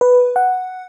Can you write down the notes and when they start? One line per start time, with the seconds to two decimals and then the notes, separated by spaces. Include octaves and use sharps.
0.01 B4
0.36 F#5